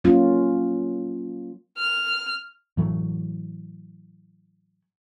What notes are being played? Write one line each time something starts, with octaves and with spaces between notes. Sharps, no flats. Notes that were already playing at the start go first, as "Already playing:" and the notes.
F#3 A#3 C#4 F4
F6
A2 E3 F#3 A3